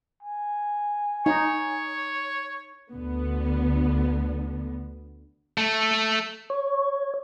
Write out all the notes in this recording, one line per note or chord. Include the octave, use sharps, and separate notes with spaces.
G#5
D#4 C#5
D2 D3 B3
A3
C#5